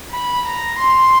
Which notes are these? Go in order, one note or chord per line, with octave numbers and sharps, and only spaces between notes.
B5
A#5
C6